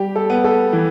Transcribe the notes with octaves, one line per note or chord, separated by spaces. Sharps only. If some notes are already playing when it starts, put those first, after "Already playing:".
Already playing: G3 G4
A4
B3
A4
E3